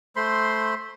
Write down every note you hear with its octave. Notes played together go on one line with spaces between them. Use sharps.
A3 C5 B5 C6